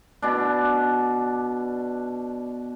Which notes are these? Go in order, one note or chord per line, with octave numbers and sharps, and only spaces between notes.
B2 D4